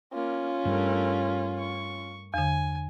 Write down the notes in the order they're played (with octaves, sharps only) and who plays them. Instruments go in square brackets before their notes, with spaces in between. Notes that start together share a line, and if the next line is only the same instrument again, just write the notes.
[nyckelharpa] A#3 [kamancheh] C#4 F4
[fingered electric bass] G2 G3 [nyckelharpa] A3 A#4
[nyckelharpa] C#6
[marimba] E2 D3 [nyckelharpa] G#5